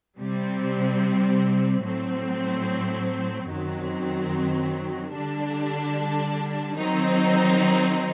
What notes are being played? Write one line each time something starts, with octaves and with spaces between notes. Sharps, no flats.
C3 G3 C4
A2 F#3 C4
F#2 D#3 F#3 C4
D3 G3 D4
D#3 F#3 C4 D#4